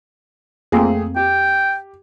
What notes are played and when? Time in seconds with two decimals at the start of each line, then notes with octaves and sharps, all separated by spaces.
0.72 F2 A3 A#3 C4 G#4
1.16 G4 G5